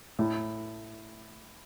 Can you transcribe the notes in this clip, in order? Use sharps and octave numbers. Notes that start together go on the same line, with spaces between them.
A2